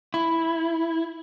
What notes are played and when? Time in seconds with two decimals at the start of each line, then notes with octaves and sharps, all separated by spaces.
0.14 E4